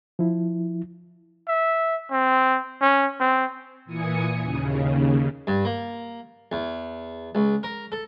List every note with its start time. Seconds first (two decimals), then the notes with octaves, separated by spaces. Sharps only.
0.19 F3 E4
1.48 E5
2.11 C4
2.81 C#4
3.20 C4
3.85 A#2 E3 G#5 D#6 C#7
4.39 D#2 C#3
5.47 G2
5.65 A#3
6.52 E2
7.35 C#2
7.63 A#4
7.92 A4